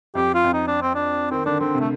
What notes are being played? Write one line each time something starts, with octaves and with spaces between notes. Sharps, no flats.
F2 G4
F4
F2
D#4
D4
C4
D4
D#3 C4
D3 D4
D3 C4
C3
A3